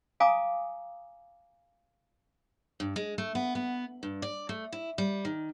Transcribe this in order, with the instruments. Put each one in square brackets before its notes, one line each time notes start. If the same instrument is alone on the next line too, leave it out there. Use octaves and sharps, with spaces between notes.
[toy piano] F5 G#5 A#5 D6 D#6
[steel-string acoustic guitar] G2
G#3
A3
B3
B3
G2
D5
A3
E4
G3
D#3